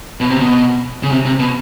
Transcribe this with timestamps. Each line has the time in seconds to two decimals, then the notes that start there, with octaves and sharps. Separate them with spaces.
0.21 B2
0.30 C3
0.40 B2
1.03 C#3
1.11 C3
1.25 C3
1.40 B2